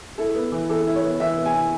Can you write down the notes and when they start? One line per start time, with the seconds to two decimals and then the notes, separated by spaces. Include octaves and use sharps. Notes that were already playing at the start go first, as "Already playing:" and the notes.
0.18 E4 A4
0.35 B3
0.52 E3
0.69 E3 A4
0.87 E4
0.96 C#5
1.03 B3
1.20 E3 E5
1.37 B3
1.46 G#5
1.54 E4